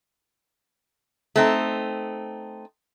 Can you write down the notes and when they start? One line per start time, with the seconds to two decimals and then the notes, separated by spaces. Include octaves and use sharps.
1.36 A3 C4 D#4